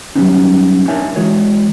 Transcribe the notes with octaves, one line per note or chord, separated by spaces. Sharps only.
F#3 G3 A#3 B3 C#4 D#4
D4 D#4 A#4 C#5 E5 G#5
E3 G#3 F#4 C#5